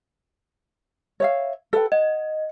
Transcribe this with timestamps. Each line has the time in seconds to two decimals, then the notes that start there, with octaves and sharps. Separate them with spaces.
1.20 C#5 E5 F5
1.73 A4 B4 G5
1.92 D#5 F#5